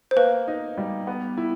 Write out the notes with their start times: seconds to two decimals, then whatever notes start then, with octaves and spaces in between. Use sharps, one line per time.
0.11 C5
0.16 A#3 B4
0.48 D#4
0.78 G3
1.07 B3
1.38 E4